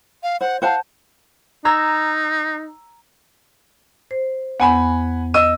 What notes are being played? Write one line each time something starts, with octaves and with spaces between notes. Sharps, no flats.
F5
C5 F#5
C5 F5 F#5 A5
D#4 A#5 E6 G#6
C5
E2 B3 F#5 G#5 B5
D#5 E6 D#7